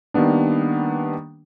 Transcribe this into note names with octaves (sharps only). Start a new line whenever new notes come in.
D#3 G3 A#3 B3 D4